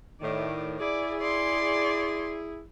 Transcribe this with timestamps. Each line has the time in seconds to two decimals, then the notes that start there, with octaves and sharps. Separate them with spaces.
0.21 A2 D#3 D5
0.80 E4 G#4 D5
1.20 D5 C6